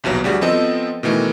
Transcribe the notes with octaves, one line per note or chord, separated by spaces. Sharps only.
A#1 D#2 B2 F#3
D2 G3 F#4 G#4
F3 B3 C4 A4 D#5
B2 D#3 E3 A3